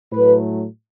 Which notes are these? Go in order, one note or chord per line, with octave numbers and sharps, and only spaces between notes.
A2 F#3 A3 B4